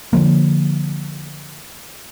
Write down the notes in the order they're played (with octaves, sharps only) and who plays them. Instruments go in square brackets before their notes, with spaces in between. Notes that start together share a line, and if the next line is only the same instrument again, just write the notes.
[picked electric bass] D3 D#3 F3 A#3